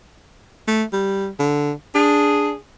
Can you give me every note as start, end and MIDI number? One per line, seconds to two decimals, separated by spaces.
0.68 0.84 57
0.93 1.29 55
1.39 1.73 50
1.95 2.52 62
1.95 2.56 68